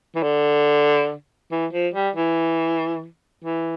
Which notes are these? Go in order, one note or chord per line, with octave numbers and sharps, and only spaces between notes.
E3
D3
E3
F3
G3
E3
E3